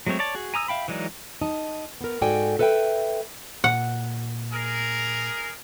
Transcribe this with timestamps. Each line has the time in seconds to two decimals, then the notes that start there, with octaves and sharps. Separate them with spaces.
0.07 F#3 G#3 A3 C4 C#5
0.19 C#5 D5 A5
0.35 F#4 G#4
0.54 G#5 A#5 D#6 E6
0.68 E5 F5 G5 B5
0.88 E3 F#3 G#3 D#4 D5
1.41 D#4 D#5 A5
2.01 B3 A#4
2.21 G#2 F#4 A4 D5 G5 G#5
2.59 A4 B4 E5 F5 G5
3.64 A#2 F#5
4.51 G#4 A#4